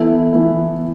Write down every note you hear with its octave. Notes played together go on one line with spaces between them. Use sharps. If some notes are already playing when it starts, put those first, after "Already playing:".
Already playing: E3 B3 E4 A4
E3 B3 E4